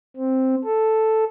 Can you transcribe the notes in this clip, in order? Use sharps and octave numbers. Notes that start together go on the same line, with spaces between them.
C4
A4